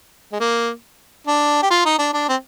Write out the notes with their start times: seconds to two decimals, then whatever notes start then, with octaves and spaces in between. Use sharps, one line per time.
0.32 G#3
0.40 A#3
1.27 D4
1.63 G4
1.70 F4
1.85 D#4
1.99 D4
2.14 D4
2.29 C4